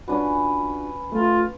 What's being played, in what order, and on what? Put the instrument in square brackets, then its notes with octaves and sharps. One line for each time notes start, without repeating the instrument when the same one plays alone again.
[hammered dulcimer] C#4 B4 [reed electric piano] D4 F4 F#4
[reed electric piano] A3 [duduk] F4